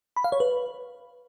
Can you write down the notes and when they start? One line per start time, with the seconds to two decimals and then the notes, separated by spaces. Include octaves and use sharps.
0.17 B5
0.24 F5
0.32 C#5
0.40 B4